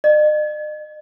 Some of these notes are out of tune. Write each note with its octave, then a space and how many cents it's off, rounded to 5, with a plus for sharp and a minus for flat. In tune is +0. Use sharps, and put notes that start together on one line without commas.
D#5 -45